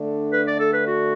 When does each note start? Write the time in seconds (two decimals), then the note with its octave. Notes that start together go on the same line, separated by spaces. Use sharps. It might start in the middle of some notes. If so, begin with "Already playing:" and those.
Already playing: D3 A3 D4
0.33 B4
0.47 D5
0.60 A4
0.73 B4
0.87 F#4